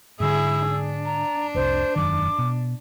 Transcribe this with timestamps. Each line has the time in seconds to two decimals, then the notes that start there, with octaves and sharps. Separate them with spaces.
0.20 G#2 D3 E4 G#4 E6
0.70 D4
1.05 A#5
1.54 F1 C2 C5
1.96 E1 F#2 D#3 D6
2.38 B2